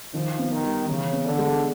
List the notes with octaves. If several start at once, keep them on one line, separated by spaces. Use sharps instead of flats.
D#3 F3
B3
D#3
G3
C#3 E3
B3
D3
G#3